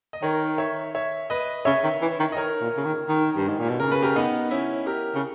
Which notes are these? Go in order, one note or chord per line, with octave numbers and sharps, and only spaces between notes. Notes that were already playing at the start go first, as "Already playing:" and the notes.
D#5
D#3 A#4 C#5
C#5 E5
C#5 E5
B4 D#5
C#3 C#5 E5
D#3
E3
D#3
D#5
A#4 C#5
A#2
C#3
D#3
D#3
G2
G#2
A#2
B2
C#3 A#4
B4
G4 A#4
B3 D#4
C#4 E4
G4 A#4
C#3